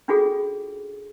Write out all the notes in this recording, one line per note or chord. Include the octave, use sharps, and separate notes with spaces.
C#4 D4 F4 F#4 G#4 A4